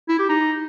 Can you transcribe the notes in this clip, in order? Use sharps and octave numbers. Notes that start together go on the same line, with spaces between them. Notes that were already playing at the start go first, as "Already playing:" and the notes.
E4
G4
D#4